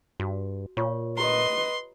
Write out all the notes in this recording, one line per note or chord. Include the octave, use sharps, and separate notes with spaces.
G2 F#4
A#2 F4 C#5 C#6
G4 B4 D#5 A#5 C6